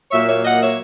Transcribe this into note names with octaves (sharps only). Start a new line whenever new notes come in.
A#2 F#3 A#3 C#5 E5
C#5 E5
D#5 F#5
C#5 E5